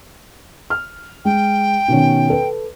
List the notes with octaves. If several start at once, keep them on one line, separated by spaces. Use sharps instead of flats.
F6
G#3 G5
B2 D#3 C#4
A4 B4